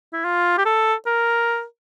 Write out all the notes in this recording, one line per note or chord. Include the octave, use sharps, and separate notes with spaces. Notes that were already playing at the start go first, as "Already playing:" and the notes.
E4
F4
G4
A4
A#4